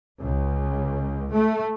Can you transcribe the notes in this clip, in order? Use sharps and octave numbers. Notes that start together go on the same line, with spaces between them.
C#2
A3